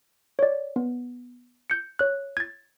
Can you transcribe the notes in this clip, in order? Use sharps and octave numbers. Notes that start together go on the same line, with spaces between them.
C#5 D5
B3
G6 C#7
C#5 F#6
G#6 A6